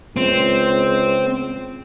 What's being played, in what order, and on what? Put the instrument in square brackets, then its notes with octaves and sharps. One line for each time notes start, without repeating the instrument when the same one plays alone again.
[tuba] C#2 [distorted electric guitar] C4